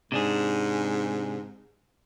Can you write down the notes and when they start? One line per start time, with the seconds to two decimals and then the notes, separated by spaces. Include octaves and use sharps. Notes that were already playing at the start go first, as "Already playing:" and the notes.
0.12 G#2 C3 D4 G#4